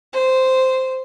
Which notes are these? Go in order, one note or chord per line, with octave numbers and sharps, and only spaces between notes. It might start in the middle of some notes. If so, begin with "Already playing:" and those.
C5